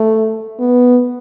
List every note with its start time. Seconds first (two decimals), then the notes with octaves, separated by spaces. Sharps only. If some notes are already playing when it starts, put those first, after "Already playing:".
Already playing: A3
0.59 B3